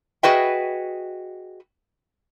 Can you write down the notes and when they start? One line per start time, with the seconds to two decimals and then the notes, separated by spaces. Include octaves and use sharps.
0.23 F#4 G#4 B4 D#5 E5 G5